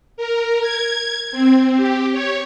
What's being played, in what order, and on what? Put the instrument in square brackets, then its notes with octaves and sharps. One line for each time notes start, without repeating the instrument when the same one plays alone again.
[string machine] A#4
G#6
C4
G4
C#5